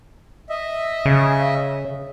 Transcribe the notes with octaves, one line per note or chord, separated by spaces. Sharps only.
D#5 E5
C#3